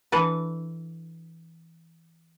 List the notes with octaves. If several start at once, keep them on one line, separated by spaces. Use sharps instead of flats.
E3 D4 A4 B4